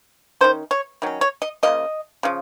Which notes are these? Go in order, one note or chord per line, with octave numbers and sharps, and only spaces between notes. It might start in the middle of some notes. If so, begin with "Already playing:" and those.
D#3 F#3 C#4 C5
C#5
D#3 F#3 C#4
C#5
D#5
C#3 F3 A#3 D#5
C#3 F3